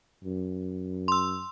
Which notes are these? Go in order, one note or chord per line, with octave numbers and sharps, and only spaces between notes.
F#2
C6 E6